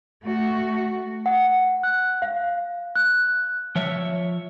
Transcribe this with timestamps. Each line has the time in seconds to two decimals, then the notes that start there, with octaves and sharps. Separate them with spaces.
0.23 A3 F#4
1.26 F#5
1.83 F#6
2.22 F5
2.96 F#6
3.76 F3 C#5 E5